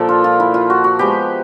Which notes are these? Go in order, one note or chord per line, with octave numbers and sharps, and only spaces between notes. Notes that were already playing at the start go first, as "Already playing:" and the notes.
Already playing: A#2 F3 A#3 A4
F4
F4
E4
F4
F#4
F#4
F3 G#3 B3 G4